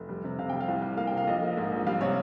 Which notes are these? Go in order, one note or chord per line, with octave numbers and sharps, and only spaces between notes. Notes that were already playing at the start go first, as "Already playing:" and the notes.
Already playing: F1
G3
C3
C3 F5
G3 G5
F5
C2
G3
A#3 F5
G5
C3 F5
A#1 D#5
A#3
G#2
A#1
G3 F5
C3 C#5